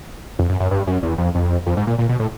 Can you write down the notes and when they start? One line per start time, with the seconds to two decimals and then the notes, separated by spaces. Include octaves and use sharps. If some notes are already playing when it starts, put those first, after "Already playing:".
0.39 F2
0.49 F#2
0.60 F#2
0.71 G2
0.87 F#2
1.03 E2
1.18 F2
1.35 F2
1.66 F2
1.77 G#2
1.87 A#2
1.98 A#2
2.09 B2
2.19 A2